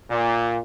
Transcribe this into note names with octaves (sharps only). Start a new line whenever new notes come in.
A#2